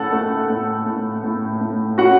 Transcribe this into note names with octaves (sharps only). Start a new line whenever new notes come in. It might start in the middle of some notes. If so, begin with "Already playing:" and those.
Already playing: A2 C#4 A4 F#5 A5
A3
A2
A2
A2
A2
C#4 F#4 F#5